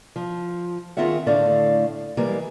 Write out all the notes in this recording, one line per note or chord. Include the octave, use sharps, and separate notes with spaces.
F3
D#3 C4 F4 G#4 E5 F#5
A2 D3 A3 D5 F5
E3 G3 G#3 A#3